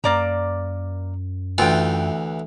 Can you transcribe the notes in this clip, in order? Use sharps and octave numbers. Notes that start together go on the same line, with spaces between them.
F#2 A#3 D5 A#5
D2 E3 F4 G5